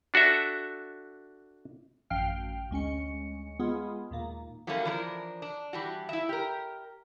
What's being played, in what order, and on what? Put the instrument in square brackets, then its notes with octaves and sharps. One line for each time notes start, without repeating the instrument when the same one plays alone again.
[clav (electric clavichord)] D4 F#4 A4 E5
[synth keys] A1 F#2 F5 G5 F6
D2 G#3 C#4 C#7
G#3 B3 F4 G#4
D#2 A#2 A#3
[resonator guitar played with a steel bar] F#3 G3 A3 A#3 C#4
E3 F3 D4 A#4
D4
E3 G3 F#4
E4 E5
G4 A#4